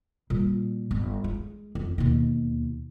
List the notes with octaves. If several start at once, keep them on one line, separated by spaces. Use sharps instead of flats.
A#2 G3
G1
G#3
F2
D#2 B2